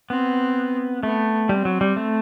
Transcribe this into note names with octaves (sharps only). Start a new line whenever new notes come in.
B3 C4
A3 B3
G3 C4
F#3
G3
A3